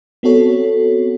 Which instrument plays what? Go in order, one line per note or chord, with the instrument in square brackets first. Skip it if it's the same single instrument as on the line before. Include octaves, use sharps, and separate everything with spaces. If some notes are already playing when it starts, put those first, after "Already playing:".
[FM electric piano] B3 C4 F#4 A4 C#5